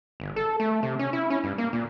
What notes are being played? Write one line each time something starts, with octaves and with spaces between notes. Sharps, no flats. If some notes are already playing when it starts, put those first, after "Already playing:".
G1
A4
A3
C3
C#4
E4
C#4
G2
A#3
A#2